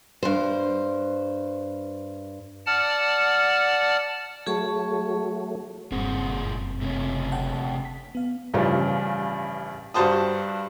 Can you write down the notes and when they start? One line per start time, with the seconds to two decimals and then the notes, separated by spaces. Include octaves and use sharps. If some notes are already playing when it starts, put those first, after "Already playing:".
0.23 G2 C5
2.66 D5 F#5 A5 F6
4.47 F#3 A3 G#4 A5 C#6
5.92 F#1 G2 A#2 C4 G#4 F#5
6.82 C3 A3 C#4
7.32 F#5 G5 A5
7.85 B6
8.15 B3 F5
8.54 A1 G2 C#3 F3 G3
9.94 G2 G3 F#4 C5 A5 D#6